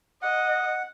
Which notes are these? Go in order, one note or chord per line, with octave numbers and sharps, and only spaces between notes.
D#5 F#5